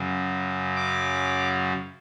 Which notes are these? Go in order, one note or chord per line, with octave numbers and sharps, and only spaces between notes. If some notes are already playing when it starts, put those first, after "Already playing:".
Already playing: F#2 C#3 F#3
D6